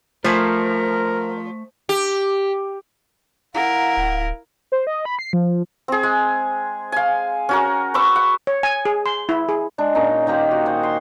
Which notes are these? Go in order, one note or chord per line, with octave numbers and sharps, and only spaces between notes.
F3 A3 A#4 C5 G#5 B5
G4
E4 A#4 F5 F#5 A#5
D1 F5
C5
D#5
B5
C7
F3
C4 G#4
G#3
F5 G#5
C#4 F#4 A#4
B4 C#6 D6 E6
F#5
C#5
G#5
G#4
C6
E4
G#4
G#3 D4
A#2 C#4 D#4 A#5
D#3 A#3 G4 C5
F#4
C5 D#5 F#5 G#5
C6